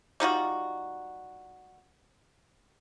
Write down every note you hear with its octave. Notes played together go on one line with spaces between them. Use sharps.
G3 D#4 F4 F#4